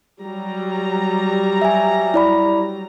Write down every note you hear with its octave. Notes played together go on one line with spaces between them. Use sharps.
F#3 G3 A#5
E5 G#5
E4 D5 B5